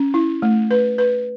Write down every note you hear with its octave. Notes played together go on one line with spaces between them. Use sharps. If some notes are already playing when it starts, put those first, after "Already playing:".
Already playing: C#4
E4
A3
B4
B4